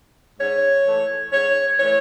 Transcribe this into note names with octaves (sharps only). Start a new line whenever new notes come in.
G#2 C#5
E3 A3
G#2 C#5
E3 A3 C#5